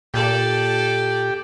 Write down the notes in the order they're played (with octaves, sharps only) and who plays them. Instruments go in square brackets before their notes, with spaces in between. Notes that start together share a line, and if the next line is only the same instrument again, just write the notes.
[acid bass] A#2 [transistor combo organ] G4 G5 [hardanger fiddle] A4 D5